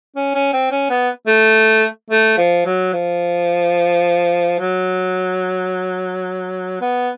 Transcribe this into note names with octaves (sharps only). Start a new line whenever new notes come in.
C#4
C#4
C4
C#4
B3
A3
A3
F3
F#3
F3
F#3
B3